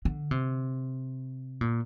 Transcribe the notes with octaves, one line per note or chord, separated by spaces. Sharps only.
D3
C3
A#2